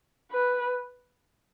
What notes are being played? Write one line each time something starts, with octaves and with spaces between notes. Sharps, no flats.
B4